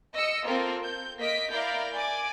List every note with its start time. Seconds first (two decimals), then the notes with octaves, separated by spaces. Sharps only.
0.14 D#5 E6 C#7
0.44 A#3 C4 F4 A4 A#4
0.83 G6
1.18 A#3 D#5 B6 D7
1.51 E4 A#4 D5 F5 A#5 G6
1.94 D5 G#5 D6